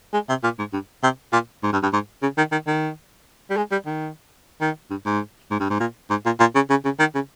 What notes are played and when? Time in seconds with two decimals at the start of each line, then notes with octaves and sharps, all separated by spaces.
0.13 G#3
0.29 C3
0.43 A#2
0.59 G#2
0.73 G2
1.03 C3
1.33 A#2
1.63 G#2
1.73 G2
1.83 G2
1.93 G#2
2.22 C#3
2.37 D#3
2.52 D#3
2.67 D#3
3.50 G3
3.57 G#3
3.71 G3
3.86 D#3
4.61 D#3
4.90 G2
5.05 G#2
5.51 G#2
5.60 G2
5.70 G#2
5.80 A#2
6.10 G#2
6.26 A#2
6.40 A#2
6.55 C#3
6.70 C#3
6.84 C#3
6.99 D#3
7.14 C#3